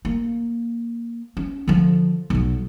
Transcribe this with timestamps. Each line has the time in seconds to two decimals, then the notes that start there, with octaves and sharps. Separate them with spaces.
0.05 A#3
1.37 C#4
1.68 D3 F3
2.30 B1 F#3